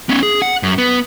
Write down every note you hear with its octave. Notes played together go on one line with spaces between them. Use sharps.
B3 C#4
G#4
F#5
F#2
B3